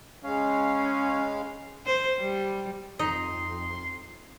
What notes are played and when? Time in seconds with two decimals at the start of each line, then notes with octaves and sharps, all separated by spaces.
0.25 C#3 G#3 C#4 F5
1.86 C5
2.20 G3
2.99 F2 D#4 D#5 C6